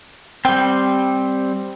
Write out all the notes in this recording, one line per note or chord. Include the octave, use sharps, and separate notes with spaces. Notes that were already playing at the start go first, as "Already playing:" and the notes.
G3 C4 G5